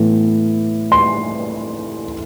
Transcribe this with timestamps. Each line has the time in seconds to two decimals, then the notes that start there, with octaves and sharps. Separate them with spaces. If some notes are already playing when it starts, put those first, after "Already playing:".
Already playing: A2 E3 B3
0.92 C6